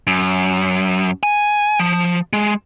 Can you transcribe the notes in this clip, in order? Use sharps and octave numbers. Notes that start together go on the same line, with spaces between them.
F#2
G#5
F3
G#3